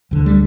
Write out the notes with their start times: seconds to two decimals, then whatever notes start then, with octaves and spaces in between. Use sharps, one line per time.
0.11 D2 D3
0.26 G3